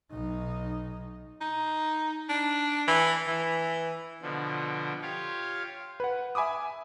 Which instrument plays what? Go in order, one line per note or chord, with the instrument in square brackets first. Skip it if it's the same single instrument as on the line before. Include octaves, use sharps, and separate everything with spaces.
[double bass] B1 D#4
[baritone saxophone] D#4
D4
E3
E3
[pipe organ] B2 D3 F3
F4 G4 C#5 F5
[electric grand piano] B4 F#5
E5 G#5 B5 D6 D#6